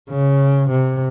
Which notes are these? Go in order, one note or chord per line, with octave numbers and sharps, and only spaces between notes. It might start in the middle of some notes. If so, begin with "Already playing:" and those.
C#3
C3